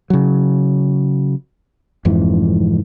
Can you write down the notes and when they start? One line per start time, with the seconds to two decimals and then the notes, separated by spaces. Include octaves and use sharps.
0.10 C#3 F#3
2.05 F1 F2 G#2 E3